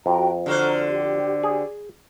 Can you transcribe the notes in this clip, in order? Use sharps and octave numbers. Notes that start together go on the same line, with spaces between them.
F2 F#4 G5 A#5
D3 F#4 C5 A#5 F6
G4
G#4